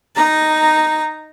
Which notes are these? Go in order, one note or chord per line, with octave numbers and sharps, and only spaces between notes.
D#4 A#5